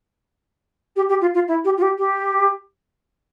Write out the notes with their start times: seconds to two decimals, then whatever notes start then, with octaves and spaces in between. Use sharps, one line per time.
0.96 G4
1.08 G4
1.21 F4
1.34 F4
1.47 E4
1.64 G4
1.77 F4
1.82 G4
1.98 G4